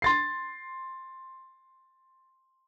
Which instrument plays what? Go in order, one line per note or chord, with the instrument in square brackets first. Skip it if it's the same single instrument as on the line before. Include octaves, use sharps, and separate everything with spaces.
[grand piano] C6 A6 C7